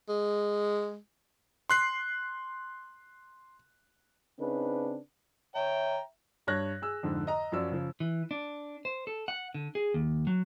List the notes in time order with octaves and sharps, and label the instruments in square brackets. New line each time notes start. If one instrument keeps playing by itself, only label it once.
[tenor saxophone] G#3
[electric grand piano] C6 F#6 C7
[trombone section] C#3 C4 D4 D#4 B4
[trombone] C#5 [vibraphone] E5 [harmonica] G5 A#5
[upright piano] G2 C#5 F#6 A#6
G#4 E6
F2 G#2 D3
D#5 A#5
F#2 F3 F#3 C#4 D5 E6
C#3 F3
[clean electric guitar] E3
D4
C5
A4
F#5
D3
G#4
D#2
F#3